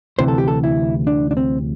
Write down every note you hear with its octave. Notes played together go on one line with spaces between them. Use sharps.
D2 C3 E3 C5
A4
G4
A4
E4
D4
D4
C4